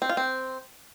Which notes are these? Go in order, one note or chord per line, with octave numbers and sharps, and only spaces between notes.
C4
F4
C4